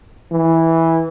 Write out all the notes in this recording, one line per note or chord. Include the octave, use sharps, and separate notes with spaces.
E3